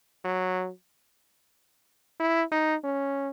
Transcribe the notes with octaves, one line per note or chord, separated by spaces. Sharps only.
F#3
E4
D#4
C#4